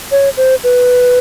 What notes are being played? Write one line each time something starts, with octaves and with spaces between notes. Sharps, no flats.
C#5
C5
B4